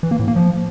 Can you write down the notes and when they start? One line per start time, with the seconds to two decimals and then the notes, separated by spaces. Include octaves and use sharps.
0.03 E3
0.11 A#3
0.19 A2
0.28 A#3
0.36 F3